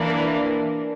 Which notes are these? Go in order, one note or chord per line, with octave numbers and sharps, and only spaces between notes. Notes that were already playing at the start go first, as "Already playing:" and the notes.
Already playing: E3 A#3 D4